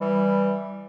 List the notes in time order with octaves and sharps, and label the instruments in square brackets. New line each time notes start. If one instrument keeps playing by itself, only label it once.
[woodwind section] E3 G3